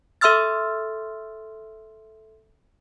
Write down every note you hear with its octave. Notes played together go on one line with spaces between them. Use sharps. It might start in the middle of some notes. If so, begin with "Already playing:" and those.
A4 E5 C6 E6 F6 A6